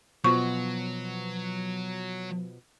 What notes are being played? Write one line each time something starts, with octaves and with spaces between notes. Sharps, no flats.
B2 F3 F#3 B3 C#6